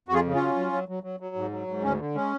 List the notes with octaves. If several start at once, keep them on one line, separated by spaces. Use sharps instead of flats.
F2 F#4
F4 G#4
C#3
C#4 F4
F#3
F#3
F#3
F#3
F#3
F#3
G#2
F#3
G#2
D2 C#4
D3
G#3 C#4